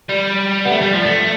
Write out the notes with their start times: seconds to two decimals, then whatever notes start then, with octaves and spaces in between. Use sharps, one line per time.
0.09 G3
0.65 B3
0.70 A3
0.81 G3
0.93 F3
1.05 A3